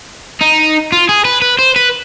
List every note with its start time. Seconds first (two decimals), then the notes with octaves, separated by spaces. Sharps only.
0.41 D#4
0.92 F4
1.09 G#4
1.25 B4
1.42 B4
1.59 C5
1.76 B4